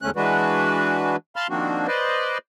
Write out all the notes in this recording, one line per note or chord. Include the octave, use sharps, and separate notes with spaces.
E2 G#2 D3 A3 C#4 F#6
E3 G#3 D4 F#4 B4
F5 A5 B5 C6 F6
D#3 F3 A#3 C4 D4 F#4
B4 C5 D5 D#5